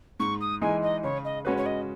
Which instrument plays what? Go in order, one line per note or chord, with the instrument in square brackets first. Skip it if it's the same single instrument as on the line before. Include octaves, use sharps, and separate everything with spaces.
[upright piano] G#2 [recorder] C#6
[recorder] D#6
[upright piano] E3 G#3 D#4 [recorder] G#5
[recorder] D#5
[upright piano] C#3 [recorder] C#5
[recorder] D#5
[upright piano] G#3 C#4 F#4 B4 [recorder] C#5
[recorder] C#5
D#5